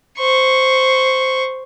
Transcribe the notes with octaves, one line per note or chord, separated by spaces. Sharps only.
C5 C#6